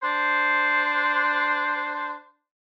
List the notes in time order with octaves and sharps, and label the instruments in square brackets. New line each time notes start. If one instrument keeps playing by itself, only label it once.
[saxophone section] D4 C5